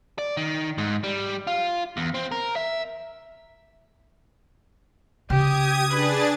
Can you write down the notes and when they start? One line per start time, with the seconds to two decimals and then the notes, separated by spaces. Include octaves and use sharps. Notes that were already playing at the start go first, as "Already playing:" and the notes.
0.19 D5
0.37 D#3
0.78 G#2
1.04 G3
1.47 F4
1.97 E2
2.14 C4
2.32 A#4
2.56 E5
5.30 C#3 G4 D#6 G#6
5.91 D4 G#4 B4 A6